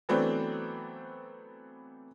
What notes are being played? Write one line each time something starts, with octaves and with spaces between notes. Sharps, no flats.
E3 F#3 A3 B3 C4 D4